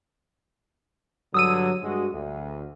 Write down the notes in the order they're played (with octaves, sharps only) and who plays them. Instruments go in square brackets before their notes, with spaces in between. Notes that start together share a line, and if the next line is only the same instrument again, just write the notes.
[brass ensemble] G2 D3 F#3 [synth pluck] D#6 E6 D#7
[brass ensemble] G2 G#3 F#4
D2